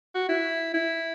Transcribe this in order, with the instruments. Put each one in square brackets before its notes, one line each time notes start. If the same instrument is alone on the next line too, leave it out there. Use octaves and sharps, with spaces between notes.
[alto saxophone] F#4
E4
E4